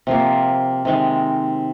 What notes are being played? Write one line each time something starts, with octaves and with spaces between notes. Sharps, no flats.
C3 F3 A#3
C3 D#3 G#3